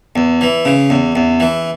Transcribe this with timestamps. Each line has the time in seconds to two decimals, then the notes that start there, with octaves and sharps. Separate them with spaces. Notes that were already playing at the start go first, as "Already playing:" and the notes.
0.16 E2
0.41 E3
0.65 C#3
0.90 E2
1.16 E2
1.40 E3